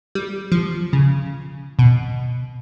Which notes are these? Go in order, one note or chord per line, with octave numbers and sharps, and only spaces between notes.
G3
F3
C#3
B2